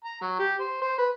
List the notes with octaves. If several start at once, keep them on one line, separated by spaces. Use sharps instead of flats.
A#5
F#3
G4
C5
C5
B4